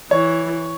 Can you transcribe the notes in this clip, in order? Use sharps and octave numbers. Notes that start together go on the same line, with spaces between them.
E3 C#5